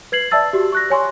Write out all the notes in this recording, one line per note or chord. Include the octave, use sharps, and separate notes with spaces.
B4 G#6 C7 F#7
D5 E5 A5 E6 A6
F#4 G4
C#6 F#6 A#6
C#5 G#5 C6 C#6